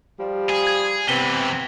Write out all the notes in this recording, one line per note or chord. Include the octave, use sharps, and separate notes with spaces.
F3 G3
G#4
G#6
C3 E3 B3 C4 B6 G7